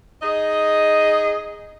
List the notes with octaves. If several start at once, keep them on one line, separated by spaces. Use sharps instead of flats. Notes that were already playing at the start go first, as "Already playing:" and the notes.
D#4 G#4 D#5